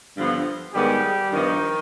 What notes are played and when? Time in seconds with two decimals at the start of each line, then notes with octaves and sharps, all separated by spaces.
0.17 G2 D3 F3 B3
0.74 G#2 D#3 G3 B3 G4
1.32 G2 D#3 F3 B3 D#4